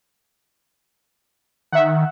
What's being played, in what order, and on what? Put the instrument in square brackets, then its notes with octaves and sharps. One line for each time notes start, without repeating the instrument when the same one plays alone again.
[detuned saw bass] D#3 [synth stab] E5 F#5